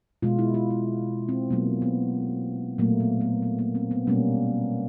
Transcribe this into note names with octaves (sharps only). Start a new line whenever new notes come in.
B2 G#3 F4
E4
F4
E4
C4
B2 F#3 A#3 B3
B3
A#2 F#3 A3 A#3
B3
B3
B3
A#3
C4
B3
B2 G3 A#3 C#4